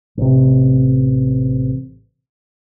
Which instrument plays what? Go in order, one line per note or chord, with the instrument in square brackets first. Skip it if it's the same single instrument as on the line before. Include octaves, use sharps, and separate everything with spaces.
[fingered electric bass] A1 C3